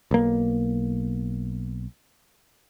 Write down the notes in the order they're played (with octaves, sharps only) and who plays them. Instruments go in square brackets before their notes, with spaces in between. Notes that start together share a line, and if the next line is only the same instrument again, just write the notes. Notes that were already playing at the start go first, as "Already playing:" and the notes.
[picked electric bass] B1 A#3